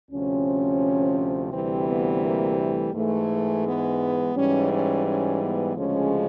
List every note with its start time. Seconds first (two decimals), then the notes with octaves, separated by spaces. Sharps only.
0.11 D2 C3 F3 C#4
1.53 D2 C3 E3 G3 C4
1.88 B3
2.23 A#3
2.58 A3
2.94 G#2 E3 G#3 A3
3.65 B3
4.35 G#2 E3 G3 C#4
4.71 C#4
5.06 C#4
5.42 B3
5.77 D2 C#3 F3 G#3 C#4